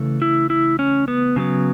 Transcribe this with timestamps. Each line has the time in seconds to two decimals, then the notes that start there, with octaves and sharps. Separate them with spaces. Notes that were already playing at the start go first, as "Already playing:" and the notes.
Already playing: C#3 E3 A3
0.22 E4
0.50 E4
0.79 C#4
1.08 B3
1.36 C#3 F#3 B3